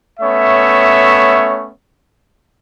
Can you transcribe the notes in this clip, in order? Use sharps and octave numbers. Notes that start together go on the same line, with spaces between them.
A3 B3 C#4 C#5 E5